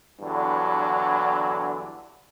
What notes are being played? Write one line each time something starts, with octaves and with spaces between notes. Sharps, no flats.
E2 G2 D3 F#3